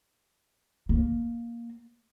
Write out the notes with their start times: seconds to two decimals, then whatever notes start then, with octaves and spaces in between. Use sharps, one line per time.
0.89 A#3